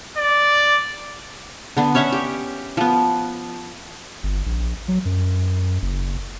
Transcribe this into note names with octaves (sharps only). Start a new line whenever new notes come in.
D5
D3 B3
C#4 C#5 E5 F#5
G4
F3 B3
G1
A#1
F#3
F#2
F#1